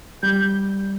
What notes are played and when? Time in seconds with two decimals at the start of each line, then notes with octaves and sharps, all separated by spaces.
0.23 G3 G6